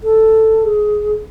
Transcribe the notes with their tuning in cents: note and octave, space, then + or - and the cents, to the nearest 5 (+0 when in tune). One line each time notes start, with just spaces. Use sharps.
A4 +5
G#4 +15